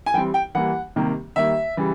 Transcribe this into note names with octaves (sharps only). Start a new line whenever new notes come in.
G#5
E3 G3 C4 G5
G5
E3 G3 A#3 F#5
C3 D#3 G3 A#3
D#3 G3 A#3 E5
C#3 E3 G3